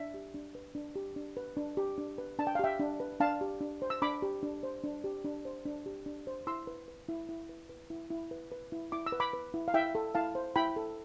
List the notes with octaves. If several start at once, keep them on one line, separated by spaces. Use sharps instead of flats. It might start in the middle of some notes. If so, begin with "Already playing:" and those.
Already playing: D4 E5
G4
D4
B4
D4
G4
D4
B4
D4
G4
D4
B4
D4 A5
G5
F5
G4 E5 G5
D4
B4
D4 F5 A5
G4
D4
C5
E6
D4 B5 D6
G4
D4
C5
D4
G4
D4
C5
D4
G4
D4
C5
E4 C6 E6
B4
B4
E4
E4
B4
B4
E4
E4
B4
B4
E4
E4 D6
E6
B4
B5 D6
B4
E4
F5
E4 E5 G5
A4
E4 F5 A5
C5
E4 G5 B5
A4